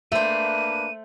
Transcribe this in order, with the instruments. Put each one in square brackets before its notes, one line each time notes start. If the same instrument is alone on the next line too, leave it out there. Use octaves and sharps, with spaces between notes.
[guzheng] A3 C5 [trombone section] A#3 D4 B4 [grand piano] E5 [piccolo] D#7